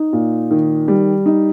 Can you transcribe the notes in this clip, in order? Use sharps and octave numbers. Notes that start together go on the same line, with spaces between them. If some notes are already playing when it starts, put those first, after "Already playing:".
Already playing: D#4
A#2
D#3
G3
D#4